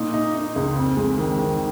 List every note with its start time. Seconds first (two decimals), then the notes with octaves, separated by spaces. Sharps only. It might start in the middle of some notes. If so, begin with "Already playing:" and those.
Already playing: A#2 D#4
0.14 D#4
0.34 D#4
0.56 C#2
0.76 F2
0.97 G#3
1.18 D#3
1.39 D#3